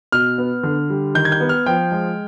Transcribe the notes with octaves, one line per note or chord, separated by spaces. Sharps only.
B2 F6
B3
D3
G3
D#3 G6
G#6
G6
B3
F6
F3 G5
G#3